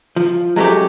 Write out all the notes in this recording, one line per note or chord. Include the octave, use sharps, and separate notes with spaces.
F3
F#3 G#3 A3 C#4 G4